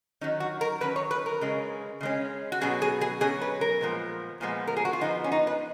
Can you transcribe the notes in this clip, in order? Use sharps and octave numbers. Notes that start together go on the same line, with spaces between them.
D#3 F#3 C#4 D#4
F#4
A#4
D#3 F#3 C#4 B4
C#5
B4
A#4
C#3 G#3 C#4
C#3 G#3 C#4
F#4
B2 F#3 C#4 G#4
G#4
G#4
B2 F#3 C#4 G#4
B4
A#4
A#2 F3 G#3 B3
A#2 F3 G#3 B3
A#4
G#4
F#4
F4
F3 B3 D#4
C#4
D#4
B4